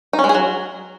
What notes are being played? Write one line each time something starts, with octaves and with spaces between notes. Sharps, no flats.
D#4
C#4
G#3
G#4
F#3